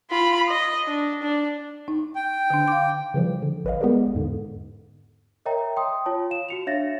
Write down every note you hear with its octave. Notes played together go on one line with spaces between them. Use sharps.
F4 B5
D#5
D4
D4
D#4
G5
D3 D4
F5 D6
C#3 E3 F3 G3
D3
G#1 B4 C#5 D#5 F5
G#3 B3 G4 G#4 A#4 D5
E2 G#2 D3
A#4 C#5 D#5 E5 G5 A#5
G5 C6 D#6
F4 C#5 A5
F5 E7
F#4 C#7 F7
D4 C#5 E5 F5 A6 A#6